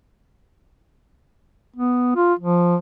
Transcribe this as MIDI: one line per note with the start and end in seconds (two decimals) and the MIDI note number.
1.76 2.14 59
2.16 2.33 65
2.39 2.76 53